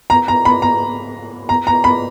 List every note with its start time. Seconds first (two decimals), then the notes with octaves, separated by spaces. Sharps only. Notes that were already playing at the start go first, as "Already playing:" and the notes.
0.10 A#5
0.28 A#5
0.45 B5
0.62 A#5
1.49 A#5
1.67 A#5
1.84 B5